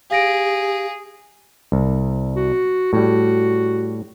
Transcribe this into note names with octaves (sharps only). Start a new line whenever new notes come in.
G4 G#4 F5 A#6 D7
C2
F#4
A2 G3 F#4